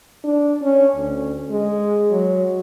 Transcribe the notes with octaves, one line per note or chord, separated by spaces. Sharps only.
D4
C#4
D2
G#3
F#3